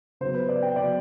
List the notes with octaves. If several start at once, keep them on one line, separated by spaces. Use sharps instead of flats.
C#3 F#3 B3 C5
B4
D5
G5
C#3 F#3 B3 D5